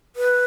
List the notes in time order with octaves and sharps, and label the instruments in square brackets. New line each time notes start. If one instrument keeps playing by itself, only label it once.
[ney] B4